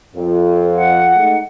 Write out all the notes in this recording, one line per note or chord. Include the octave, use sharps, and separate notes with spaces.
F2
F#5
G#3 A3 D#4